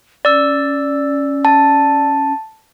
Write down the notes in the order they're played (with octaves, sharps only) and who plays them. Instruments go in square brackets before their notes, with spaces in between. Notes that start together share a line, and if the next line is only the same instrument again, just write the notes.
[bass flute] C#4 [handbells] D5 E6
[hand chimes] A5